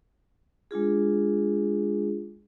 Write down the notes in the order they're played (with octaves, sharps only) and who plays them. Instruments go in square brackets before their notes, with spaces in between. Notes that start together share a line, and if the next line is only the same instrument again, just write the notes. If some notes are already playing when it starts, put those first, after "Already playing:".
[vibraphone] G#3 D4 F4 G#4